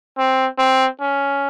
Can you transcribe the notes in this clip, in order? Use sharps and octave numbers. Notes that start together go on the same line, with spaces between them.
C4
C4
C#4